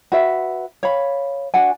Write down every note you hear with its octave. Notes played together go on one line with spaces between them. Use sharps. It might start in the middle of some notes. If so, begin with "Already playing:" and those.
F#4 B4 E5
C#5 F5 B5
D4 F#4 F#5 G#5